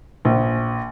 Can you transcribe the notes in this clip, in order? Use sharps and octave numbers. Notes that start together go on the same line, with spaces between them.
A#1